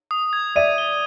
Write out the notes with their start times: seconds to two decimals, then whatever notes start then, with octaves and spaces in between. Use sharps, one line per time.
0.11 D#6
0.33 G#6
0.56 D5 E5 D#7
0.78 G7